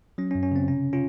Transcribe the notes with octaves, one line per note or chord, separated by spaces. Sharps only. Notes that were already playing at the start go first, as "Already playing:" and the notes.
F#3 C#4
C#4
F#2
C#4
C#3 C4
C3 C#4
C#4 F4